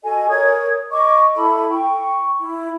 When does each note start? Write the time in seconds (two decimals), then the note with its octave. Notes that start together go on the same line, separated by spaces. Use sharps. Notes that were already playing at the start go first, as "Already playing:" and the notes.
0.03 F#4 A4 D#5 G#5
0.30 A#4 C#5 D#6 G#6
0.91 D#5 C#6 D6
1.34 E4 A4 B5
1.71 G5 C#6
2.39 E4